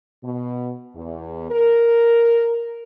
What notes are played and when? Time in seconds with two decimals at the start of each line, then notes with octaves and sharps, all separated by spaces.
0.22 B2
0.95 E2
1.50 A#4